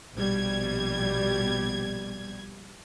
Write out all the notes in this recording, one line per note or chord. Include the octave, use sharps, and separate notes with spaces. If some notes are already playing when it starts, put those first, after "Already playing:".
A#1 B2 G3 G#6